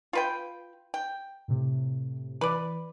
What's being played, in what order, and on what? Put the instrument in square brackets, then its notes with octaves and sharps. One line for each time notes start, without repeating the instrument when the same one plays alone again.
[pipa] F4 B4 G5
G5
[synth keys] A2 C3
[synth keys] E3 [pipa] B4 D5